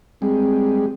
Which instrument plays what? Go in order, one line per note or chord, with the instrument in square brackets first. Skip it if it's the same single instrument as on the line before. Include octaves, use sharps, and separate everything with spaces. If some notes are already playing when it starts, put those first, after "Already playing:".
[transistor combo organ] G3 G#3 [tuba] C4